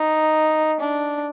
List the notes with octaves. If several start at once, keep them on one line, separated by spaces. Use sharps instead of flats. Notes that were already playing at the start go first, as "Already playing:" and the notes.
Already playing: D#4
D4